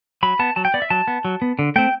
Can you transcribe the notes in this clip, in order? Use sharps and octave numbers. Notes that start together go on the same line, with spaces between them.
F#3 B5
B3 A5
F#3 A5
G5
B3 D5
E5
F#3 A5
B3
F#3
B3
D3
A3 C4 G5